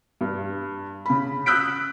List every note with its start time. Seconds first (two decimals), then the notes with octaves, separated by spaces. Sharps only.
0.21 G2
1.06 C#3 B5
1.46 D#6 E6 F#6 G6 B6 D7